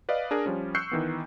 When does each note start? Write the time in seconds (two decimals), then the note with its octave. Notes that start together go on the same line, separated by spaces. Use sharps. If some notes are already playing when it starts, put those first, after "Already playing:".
0.09 B4 D5 D#5 F5
0.31 D4 G#4 A#4
0.46 F3 G3 C#4
0.75 C#6 E6 F#6 G6 C7 C#7
0.92 D#3 E3 B3